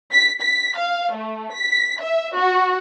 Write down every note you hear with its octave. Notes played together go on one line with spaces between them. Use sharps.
B6
B6
F5
A3
B6
E5
F#4